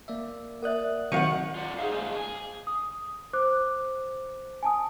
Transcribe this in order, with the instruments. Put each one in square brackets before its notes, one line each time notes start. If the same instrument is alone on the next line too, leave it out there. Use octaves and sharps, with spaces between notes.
[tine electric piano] A#3 D5 E5
[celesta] A#4 D5 E5 [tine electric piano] F#5 D#6 F#6
[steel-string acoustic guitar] D#3 F5 F#5 [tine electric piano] F#3 C4 F#4 [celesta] C#7 D#7
[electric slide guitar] F4 D5 F#5
[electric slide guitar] D#4 C5 [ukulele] G#4 E5 F5
[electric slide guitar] G#2 A#3 F4 [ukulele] G#5
[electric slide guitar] G#4
[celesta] D#6
C5 D6 F#6
G#5 A5 D#6